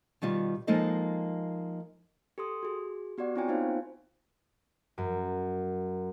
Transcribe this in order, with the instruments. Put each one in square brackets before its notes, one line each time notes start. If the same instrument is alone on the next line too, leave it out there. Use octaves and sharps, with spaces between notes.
[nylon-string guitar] B2 D#3 G3 F4
F3 G#3 A#3 D#4 A4 D#5
[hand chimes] G4 A4 C6 D#6
F#4 G#4
B3 F#4 G4 D5 F#5
C4 E4 F4 C#5 G5 G#5
A#3 B3 D#4 F4 C5 F5
[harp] F#2